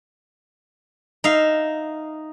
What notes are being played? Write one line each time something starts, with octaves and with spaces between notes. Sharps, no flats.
D#4 E5 F5